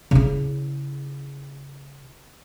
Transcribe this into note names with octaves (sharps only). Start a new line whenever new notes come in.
C#3 E4